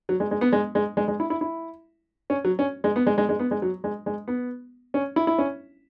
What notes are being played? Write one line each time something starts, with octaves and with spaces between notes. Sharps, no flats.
F#3
G#3
G#3
B3
G#3
G#3
G#3
G#3
E4
E4
E4
C#4
F#3
C#4
G#3
B3
G#3
G#3
G#3
B3
G#3
F#3
G#3
G#3
B3
C#4
E4
E4
C#4